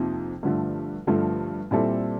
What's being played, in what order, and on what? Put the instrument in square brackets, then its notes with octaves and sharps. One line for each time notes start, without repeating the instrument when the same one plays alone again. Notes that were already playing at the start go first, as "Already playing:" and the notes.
Already playing: [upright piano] F2 C3 F3 A#3 D#4
G2 D3 F3 A3
G2 D3 F3 A3
A#2 G3 C4 E4 A4